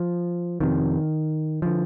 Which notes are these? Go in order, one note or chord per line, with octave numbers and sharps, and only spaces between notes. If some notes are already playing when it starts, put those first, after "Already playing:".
Already playing: F3
F2 C3 D#3
D3 F3